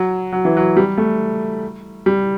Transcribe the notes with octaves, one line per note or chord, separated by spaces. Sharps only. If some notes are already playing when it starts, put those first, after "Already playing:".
Already playing: F#3
F#3
E3
F#3
G3
A3
G3